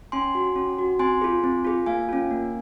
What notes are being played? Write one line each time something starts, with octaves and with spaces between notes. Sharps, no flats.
C#4 G#5 C6
F#4
C#4
F#4
C4 G#5 C6
F4 G#4
C4
F4 G#4
A#3 F5 G#5
C#4 F4
A#3